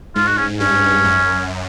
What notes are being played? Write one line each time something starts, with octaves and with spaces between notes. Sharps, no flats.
G#2 F4
F#4
C#4
G2 C#4
F#2